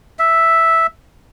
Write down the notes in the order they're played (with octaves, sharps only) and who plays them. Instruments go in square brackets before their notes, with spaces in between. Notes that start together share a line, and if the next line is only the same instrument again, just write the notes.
[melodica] E5